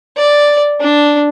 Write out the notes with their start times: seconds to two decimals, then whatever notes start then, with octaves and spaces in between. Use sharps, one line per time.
0.17 D5
0.81 D4